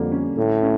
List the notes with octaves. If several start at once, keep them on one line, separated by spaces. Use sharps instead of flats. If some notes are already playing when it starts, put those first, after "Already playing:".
Already playing: F2 D3 G3 A#3
C#4
A2 A3
C#4